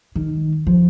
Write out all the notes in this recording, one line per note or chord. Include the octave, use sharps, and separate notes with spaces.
D#3
F3